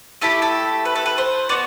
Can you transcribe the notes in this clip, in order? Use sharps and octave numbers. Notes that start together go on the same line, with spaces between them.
A3 E4 G4 A4
A4
B4
A4
B4
C5
B3 F#4 D5